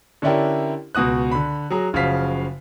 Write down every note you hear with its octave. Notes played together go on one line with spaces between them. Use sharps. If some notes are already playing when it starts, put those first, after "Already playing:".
D3 C#4 D4 E4 G4 A#4
C#2 B2 F#4 D#6 F#6
D3 B5
F#3 G#4 A#5
F#1 C#3 F3 F#4 F5 B6